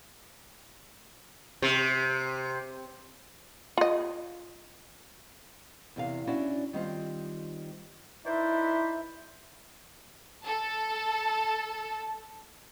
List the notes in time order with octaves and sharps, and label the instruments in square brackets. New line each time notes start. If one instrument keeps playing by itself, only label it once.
[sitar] C3
[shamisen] F4 D#5
[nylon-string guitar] E2 C3 F5
C#4 D4 E4 F#4 D5
D#3 G3 C4 F4
[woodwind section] D#4 E4 B4 C5 D5 E5
[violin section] A4 A5